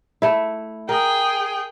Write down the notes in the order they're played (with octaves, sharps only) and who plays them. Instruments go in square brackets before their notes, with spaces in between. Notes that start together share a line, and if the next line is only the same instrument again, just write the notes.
[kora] A3 E4
[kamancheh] G#4 G5 [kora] A#4